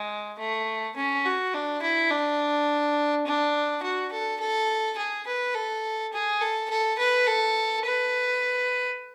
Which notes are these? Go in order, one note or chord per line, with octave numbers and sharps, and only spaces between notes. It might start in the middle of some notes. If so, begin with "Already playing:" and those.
Already playing: G#3
A3
C#4
F#4
D4
E4
D4
D4
F#4
A4
A4
G#4
B4
A4
G#4
A4
A4
B4
A4
B4